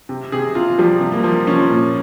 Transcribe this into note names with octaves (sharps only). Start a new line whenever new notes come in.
C3
C3 G#4
C3 F4
F3 G3
C3
A#3
F3
F3 C#4
A#2